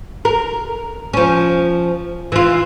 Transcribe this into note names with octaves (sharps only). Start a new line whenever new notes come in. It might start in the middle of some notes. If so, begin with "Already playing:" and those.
A#4
F3 C#4
E3 F4